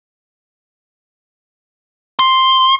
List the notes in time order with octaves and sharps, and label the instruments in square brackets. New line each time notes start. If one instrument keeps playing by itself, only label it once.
[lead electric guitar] C6